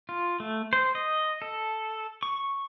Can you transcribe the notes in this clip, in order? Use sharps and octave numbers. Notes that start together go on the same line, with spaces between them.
F4
A3
C5
D#5
A4
C#6